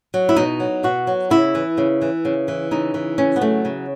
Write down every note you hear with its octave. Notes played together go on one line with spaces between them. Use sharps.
F#3
E4
B2 D#4
F#3
B2 F#4
F#3
C#3 E4
E3
C#3
E3
C#3
E3
C#3 D#4
E3
C#3 C#4
B3
F#3 A3
C#3